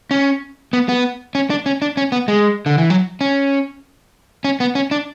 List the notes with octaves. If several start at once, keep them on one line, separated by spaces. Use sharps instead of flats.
C#4
B3
B3
C#4
D4
C#4
D4
C#4
B3
G#3
D3
E3
F#3
C#4
C#4
B3
C#4
D4